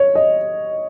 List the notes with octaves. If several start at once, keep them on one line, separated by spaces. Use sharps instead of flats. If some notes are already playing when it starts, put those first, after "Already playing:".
Already playing: C#5
D#5